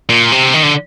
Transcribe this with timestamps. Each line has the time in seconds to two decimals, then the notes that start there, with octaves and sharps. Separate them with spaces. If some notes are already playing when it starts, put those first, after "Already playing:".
0.09 A#2
0.32 C3
0.54 D#3
0.63 D3